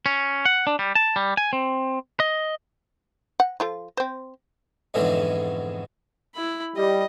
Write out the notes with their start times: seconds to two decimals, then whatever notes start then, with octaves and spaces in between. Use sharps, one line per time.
0.06 C#4
0.45 F#5
0.67 D4
0.79 G3
0.95 A5
1.16 G3
1.37 G#5
1.53 C4
2.20 D#5
3.40 F#5
3.60 F3 F4 A4
3.97 C4 C5
4.94 F2 G#2 B2 D3 E3 F#3
6.35 E4 B5
6.77 G3 D#5